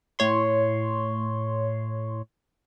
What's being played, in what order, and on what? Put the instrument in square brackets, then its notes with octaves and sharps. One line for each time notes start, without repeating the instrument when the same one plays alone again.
[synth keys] A2 C#5 C6